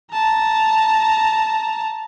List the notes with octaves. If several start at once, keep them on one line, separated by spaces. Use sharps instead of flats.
A5 A#5